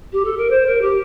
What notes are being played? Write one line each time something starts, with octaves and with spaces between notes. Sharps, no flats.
G4
A4
A#4
C5
A#4
G4